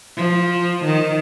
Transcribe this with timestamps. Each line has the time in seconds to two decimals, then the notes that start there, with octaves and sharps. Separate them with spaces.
0.17 F3
0.85 D#3